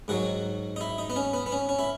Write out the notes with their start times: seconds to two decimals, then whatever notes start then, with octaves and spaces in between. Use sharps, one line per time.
0.08 G#2 D#3 F#3 F#4
0.76 D#4
0.81 E4
0.98 D#4
1.10 B3
1.16 C#4
1.34 B3
1.46 B3
1.52 C#4
1.69 C#4
1.79 E4